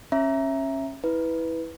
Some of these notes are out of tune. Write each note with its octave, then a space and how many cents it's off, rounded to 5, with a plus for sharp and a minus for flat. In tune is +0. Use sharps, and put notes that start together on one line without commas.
C#4 -25 E5 +0 A#5 +0
E4 -20 B4 +0